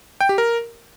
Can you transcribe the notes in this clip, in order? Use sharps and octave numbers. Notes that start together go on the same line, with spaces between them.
G5
G4
A#4